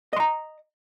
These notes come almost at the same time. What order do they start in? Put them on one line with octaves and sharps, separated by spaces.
D#5 C6 A#5